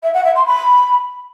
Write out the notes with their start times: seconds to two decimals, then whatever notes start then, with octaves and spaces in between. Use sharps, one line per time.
0.03 E5
0.13 F#5
0.24 E5
0.35 C6
0.46 B5